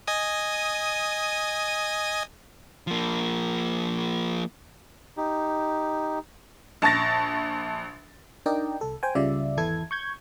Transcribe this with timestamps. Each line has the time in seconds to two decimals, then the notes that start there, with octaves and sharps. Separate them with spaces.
0.07 D#5 G#5 D#6
2.87 F3 A#3
5.17 D#4 G4
6.82 A#1 A5 C#6 A6 A#6
8.46 D4 D#4 A#4 D5 D#5 G5
8.81 C2 A4
9.03 C5 G5 G#5
9.15 C#2 C#3 G3 F4 D5 E5
9.57 G#1 E2 E3 E4 A4 G#6
9.91 C#6 G6 G#6